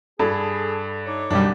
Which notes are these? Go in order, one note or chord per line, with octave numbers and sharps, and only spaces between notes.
G2 G#4 A4 A5 B5
D#4 C#5 D6
D1 F#2 B2 G3 D4